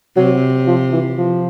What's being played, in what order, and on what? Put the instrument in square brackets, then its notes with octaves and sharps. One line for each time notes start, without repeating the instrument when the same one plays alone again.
[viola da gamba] C3 [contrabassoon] F#3
[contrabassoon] F3
E3
F3